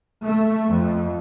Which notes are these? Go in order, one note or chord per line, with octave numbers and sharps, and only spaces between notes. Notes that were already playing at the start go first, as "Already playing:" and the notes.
A3
F2